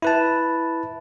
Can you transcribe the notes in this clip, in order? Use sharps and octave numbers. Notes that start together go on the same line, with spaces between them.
E4 B4 A5